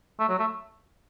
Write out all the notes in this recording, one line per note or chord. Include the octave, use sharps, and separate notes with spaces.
A3
F#3
A3